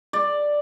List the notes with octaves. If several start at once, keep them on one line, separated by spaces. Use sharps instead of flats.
D5